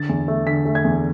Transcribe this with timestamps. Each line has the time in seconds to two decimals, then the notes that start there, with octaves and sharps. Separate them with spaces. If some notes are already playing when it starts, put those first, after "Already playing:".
Already playing: D3 A6
0.09 E2
0.28 A3
0.47 D3 B6
0.65 A3
0.75 G#6
0.85 E2